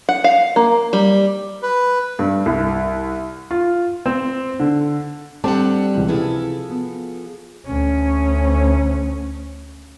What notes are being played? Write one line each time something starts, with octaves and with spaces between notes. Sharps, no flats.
F#5
F5
A#3
G3
B4
G2
C2
F4
C4
D3
G3 C4 D4 A4 F#5 A5 D6
C#2 E3
C3 F3 E4 G#4 A4 B4
B3
D2 C#4